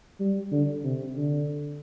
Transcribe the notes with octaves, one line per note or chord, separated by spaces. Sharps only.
G3
D3
C3
D3